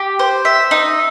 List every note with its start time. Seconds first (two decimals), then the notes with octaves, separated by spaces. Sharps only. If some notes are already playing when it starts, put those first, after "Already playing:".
Already playing: G4
0.19 C5
0.45 E5
0.71 D#4